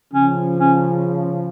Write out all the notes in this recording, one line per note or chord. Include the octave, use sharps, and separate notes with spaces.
C#3 F3 C#4
C#4